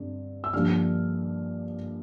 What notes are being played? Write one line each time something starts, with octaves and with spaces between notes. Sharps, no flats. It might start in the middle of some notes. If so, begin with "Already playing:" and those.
Already playing: G2 D3 C4
E6
G2 D3 F3 A#3 F6